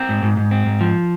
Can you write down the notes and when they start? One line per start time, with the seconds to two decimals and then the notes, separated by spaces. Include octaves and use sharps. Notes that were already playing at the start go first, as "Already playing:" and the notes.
Already playing: C4 A#4
0.09 G#2
0.23 G#2
0.37 G#2
0.51 C4
0.66 G#2
0.81 F3